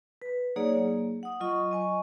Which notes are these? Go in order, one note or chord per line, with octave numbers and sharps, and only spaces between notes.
B4
F#3 A#3 D#4 G#4 C#5 D5
A#3
F#5 D#6
F#3 F4 D#5 C#6
D#5 G#5 C#6